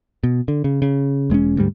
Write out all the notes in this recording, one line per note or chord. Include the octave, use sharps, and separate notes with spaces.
B2
D3
C#3
C#3
E1 G#3 C4 C#4
D2 G#2 G3